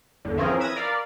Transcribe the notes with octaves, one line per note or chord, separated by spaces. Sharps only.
G1 E2 D3
E3 F3 C4 C#4 G#4 A#4
B4 E5 D#6 G#6 A#6
A#4 D5 F5 B5